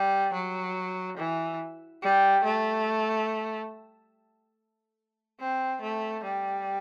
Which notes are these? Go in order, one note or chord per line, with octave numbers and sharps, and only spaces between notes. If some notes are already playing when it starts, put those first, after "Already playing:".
Already playing: G3
F#3
E3
G3
A3
C4
A3
G3